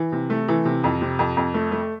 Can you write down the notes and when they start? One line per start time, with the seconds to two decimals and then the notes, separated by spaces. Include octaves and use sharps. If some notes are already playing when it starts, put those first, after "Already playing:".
Already playing: E3
0.12 C3
0.30 A3
0.48 E3
0.65 C3
0.84 F2
1.01 C3
1.19 F2
1.37 F2
1.54 A3
1.72 A3